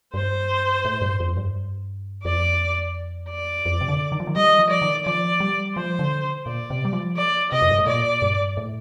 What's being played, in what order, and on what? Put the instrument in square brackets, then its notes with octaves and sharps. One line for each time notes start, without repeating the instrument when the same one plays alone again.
[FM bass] G2 [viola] C5
[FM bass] A2
G2
F2
G2
[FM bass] F2 [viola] D5
[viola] D5
[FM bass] F2
C3
D3
D#3
F3
D#3
[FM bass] G3 [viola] D#5
[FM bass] F3
[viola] D5
[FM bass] D#3
[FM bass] F3 [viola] D5
[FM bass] G3
[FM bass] F3 [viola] C5
[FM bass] D3
[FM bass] A#2 [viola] D5
[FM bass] C3
G3
F3
[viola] D5
[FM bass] C3 [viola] D#5
[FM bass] F2
G2
A2
[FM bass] A#2 [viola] D5
[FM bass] G2
A2